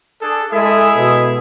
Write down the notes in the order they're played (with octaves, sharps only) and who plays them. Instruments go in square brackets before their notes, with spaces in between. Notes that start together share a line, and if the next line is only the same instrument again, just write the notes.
[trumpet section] D4 G#4 A4
[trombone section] G#3 A4 [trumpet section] E4 G#4 E5
[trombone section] B2